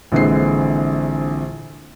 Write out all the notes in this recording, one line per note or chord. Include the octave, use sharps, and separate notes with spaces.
A#1 D3 E3 G#3 C4 C7